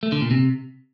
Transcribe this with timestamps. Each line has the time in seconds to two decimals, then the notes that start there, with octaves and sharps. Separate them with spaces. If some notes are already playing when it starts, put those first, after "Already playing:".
0.03 A3
0.12 D3
0.21 A#2
0.31 C3